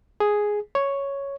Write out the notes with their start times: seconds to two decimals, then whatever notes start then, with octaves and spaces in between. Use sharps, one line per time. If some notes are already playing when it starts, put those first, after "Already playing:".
0.20 G#4
0.75 C#5